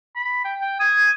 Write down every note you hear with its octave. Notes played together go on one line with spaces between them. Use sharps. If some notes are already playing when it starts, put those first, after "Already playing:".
B5
G5
G5
D#6 G#6